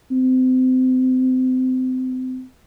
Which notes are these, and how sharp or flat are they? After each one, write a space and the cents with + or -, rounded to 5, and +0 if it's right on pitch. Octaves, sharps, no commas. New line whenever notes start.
C4 -30